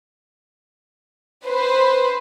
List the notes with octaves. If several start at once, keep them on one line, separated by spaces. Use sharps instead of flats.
B4 C5